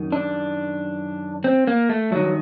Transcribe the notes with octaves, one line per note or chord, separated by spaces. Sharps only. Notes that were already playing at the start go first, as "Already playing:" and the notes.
Already playing: F#2 D#3
D4
C4
A#3
A3
G2 D#3 F#3